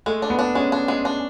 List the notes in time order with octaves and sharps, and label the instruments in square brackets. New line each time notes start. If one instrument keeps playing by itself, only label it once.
[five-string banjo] G#3 [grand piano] A3
[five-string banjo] D4
[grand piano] B3
[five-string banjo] D4
[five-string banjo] G#3 [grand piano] C#4
[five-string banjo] D4
G#3
D4